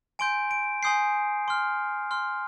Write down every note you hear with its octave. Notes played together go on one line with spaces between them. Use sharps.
G#5 C6 G6 D7
D7
G#5 C6 D#6 G6 C7
C6 F6
C6 F6